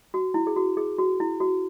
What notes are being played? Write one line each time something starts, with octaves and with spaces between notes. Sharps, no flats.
F#4
E4
G#4
F#4
G#4
F#4
E4
F#4